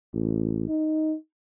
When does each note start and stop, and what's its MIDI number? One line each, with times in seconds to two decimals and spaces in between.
0.14 0.66 33
0.68 1.15 63